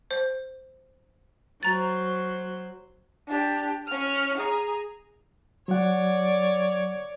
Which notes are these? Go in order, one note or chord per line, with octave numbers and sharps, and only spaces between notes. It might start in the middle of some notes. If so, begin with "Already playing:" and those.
C5
F#3 C5 A#5 A6
D4 G4
C#4 F6
G#4 A#5
F#3 C#5 D5 F#5